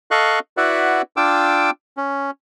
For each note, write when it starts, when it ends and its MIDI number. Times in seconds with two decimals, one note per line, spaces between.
0.11 0.39 69
0.11 0.39 75
0.11 0.39 77
0.11 0.39 85
0.11 0.39 90
0.57 1.02 64
0.57 1.02 66
0.57 1.02 71
0.57 1.02 74
0.57 1.02 76
0.57 1.02 78
1.17 1.70 62
1.17 1.70 65
1.17 1.70 79
1.17 1.70 86
1.17 1.70 88
1.97 2.31 61